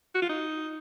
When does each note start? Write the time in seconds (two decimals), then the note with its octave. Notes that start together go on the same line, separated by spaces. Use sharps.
0.15 F#4
0.22 F4
0.29 D#4